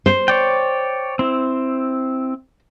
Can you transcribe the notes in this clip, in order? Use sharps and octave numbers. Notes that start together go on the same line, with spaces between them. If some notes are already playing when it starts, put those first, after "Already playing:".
C5
C#5 D5 G5
C4 E4